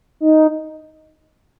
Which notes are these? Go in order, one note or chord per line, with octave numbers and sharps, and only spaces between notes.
D#4